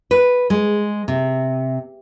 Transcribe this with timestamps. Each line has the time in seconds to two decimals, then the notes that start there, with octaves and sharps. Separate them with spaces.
0.11 B4
0.50 G#3
1.08 C3